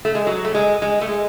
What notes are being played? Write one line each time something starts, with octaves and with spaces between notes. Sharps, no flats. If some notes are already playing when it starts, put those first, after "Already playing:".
A3
G#3
F#3
A3
G#3
G#3
A3
G#3